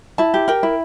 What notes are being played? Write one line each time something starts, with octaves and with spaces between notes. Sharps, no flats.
E4 A5
G4
A#4 G5
E4